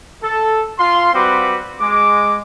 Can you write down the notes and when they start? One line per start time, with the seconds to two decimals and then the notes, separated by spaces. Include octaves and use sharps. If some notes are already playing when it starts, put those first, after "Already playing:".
0.24 A4
0.79 F4 C6
1.14 G3 C4 F#4 B4 D6
1.80 G#3 D6